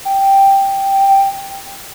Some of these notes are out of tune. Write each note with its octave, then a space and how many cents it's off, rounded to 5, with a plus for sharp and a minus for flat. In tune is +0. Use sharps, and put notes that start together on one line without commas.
G5 +0